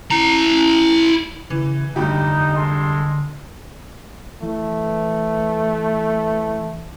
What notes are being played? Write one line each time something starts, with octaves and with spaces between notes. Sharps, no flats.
E4 A#5
C#3 E3
F1 G2 D3 D#4 G4
G#3 A4 C6
E3 A3